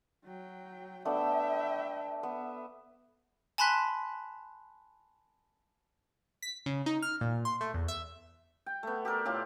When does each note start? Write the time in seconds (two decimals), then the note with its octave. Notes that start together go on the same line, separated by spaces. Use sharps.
0.24 F#3 G5
1.05 A3 B3 D4 E5 G5
2.23 B3 E5
3.58 G#5 A5 B5 C6 F#6 B6
6.42 B6
6.66 C#3
6.86 D#4
7.02 F6
7.21 A#2
7.45 C6
7.61 A3
7.74 E2
7.88 E5
8.66 G5
8.83 A3 B3
9.05 G4 A4 A#4 D5
9.25 A2 F4 G4 F5